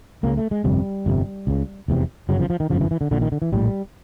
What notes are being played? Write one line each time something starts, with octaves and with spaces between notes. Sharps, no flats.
C#2 C#3 A#3
A3
G#3
G1 F2 C3 G3
G1 F2 C3
C#2 C#3
F1 E2 C3
G1 F#2 C#3 F#3
F3
F3
D#3
G1 F#2 C#3 F3
E3
E3
D3
A#1 A#2 D3
D#3
D3
E3
A#1 A2 G3